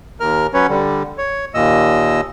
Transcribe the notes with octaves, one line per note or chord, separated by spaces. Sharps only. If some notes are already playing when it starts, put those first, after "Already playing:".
D#2 A#4 F6
F#3 C#4 B4 C#5
D3 G3
C#5
D#2 A#2 D#5 E6